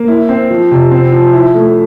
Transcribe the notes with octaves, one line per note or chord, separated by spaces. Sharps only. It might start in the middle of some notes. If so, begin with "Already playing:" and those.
Already playing: A#3
E4
C4
F3
C3
C4
F3
E4
A3